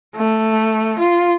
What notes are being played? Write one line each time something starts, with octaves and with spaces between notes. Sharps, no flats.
A3
F4